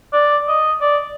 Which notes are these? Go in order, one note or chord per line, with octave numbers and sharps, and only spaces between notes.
D5
D#5
D5